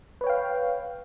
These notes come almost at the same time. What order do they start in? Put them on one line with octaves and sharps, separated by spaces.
B4 C#5 G5 F5